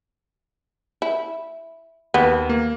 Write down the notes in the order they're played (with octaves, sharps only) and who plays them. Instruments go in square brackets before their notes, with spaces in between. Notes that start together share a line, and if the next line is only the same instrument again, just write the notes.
[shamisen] E4
[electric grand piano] D#2 [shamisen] B3
[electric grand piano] A#3